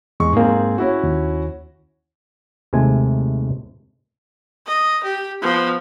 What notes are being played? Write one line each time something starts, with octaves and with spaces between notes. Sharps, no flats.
E2 G#3 C#6
G#2 A#3 C4 G#4
C#4 E4 F#4
D#2
D#2 C3 G#3 A3 G#5
D#5
G4
F3 B3